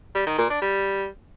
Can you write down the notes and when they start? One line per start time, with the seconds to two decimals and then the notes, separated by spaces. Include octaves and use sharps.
0.15 G3
0.27 D#3
0.38 A#2
0.50 D4
0.62 G3